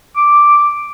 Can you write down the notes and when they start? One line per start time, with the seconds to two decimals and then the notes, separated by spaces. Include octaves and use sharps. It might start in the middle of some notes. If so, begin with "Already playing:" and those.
0.17 D6